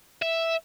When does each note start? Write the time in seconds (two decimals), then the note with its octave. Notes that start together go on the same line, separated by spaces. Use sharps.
0.22 E5